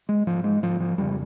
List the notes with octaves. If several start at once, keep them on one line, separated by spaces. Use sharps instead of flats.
G#3
G#2 F3
G#3
G#2 F3
F3
F2 C#3 G3